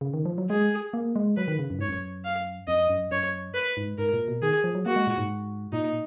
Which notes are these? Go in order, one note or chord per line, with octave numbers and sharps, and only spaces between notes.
C#3
D#3
F3
F#3
G#3 G#4
A#3
G#3
F#3 B4
D#3
C#3
F#2
G#2 C#5
F#2
F5
F2 D#5
F#2
F#2 C#5
B4
G#2
G#2 A#4
A#2
B2
D#3 G#4
F3
F#3
A#3 F#4
G#3
A#2
G#2
A#2 D#4